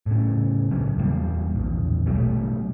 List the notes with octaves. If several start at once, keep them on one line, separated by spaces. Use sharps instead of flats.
A2 C#3
A2 C#3 F#3 B3
E2 G2 G3 A#3
A#1 E2
B2 F#3 G3 A3